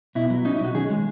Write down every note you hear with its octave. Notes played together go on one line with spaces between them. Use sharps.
B2 E4
F#3
C#4 D#4
E4
B1 F#4
D#3 G#4
G#3